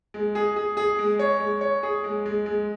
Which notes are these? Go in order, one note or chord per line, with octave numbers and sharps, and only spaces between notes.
G#3
G#4
G#4
G#4
G#3
C#5
G#3
C#5
G#4
G#3
G#3
G#3